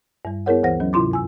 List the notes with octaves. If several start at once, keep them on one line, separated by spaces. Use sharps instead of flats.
G2 G3
B3 E4 G#4 A#4 C#5 F#5
D2 E3 C5 F#5 A#6
F#3 C#4
G#2 C3 E4 F4 C6 D6
G2 G#5 E6